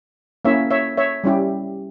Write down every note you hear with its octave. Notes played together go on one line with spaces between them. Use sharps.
A#3 C#4 E4 C#5 E5
C#5 E5
C#5 E5
G3 C#4 E4 G4